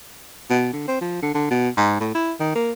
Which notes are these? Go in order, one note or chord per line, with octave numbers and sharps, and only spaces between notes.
B2
D3
C4
F3
D3
D3
B2
G#2
A2
E4
D#3
A#3